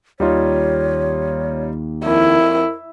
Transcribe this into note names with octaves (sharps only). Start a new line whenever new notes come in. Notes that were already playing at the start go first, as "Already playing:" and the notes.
D#2 G3 D#4 F4 C#5
F2 E4 A#4